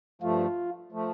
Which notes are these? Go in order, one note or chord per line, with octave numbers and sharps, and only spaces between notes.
G2 F3 A3 F4
F3 A3